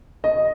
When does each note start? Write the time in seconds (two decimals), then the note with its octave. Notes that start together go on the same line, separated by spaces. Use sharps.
0.24 D#5